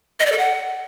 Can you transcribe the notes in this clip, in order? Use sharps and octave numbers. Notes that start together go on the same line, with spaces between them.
D#5
D5
A4
F#5